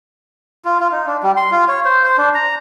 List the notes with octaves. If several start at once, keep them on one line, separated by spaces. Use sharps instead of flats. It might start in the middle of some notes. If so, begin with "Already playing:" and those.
F4
F4
D#4
D4
G3
C6
F4
C#5
C5
C5
D4
A#5